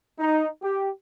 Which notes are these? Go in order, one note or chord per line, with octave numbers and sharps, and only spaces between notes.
D#4
G4